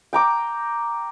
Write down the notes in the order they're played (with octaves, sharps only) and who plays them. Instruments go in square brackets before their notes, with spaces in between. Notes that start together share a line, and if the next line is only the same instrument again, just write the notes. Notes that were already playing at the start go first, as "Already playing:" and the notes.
[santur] G5 A#5 D6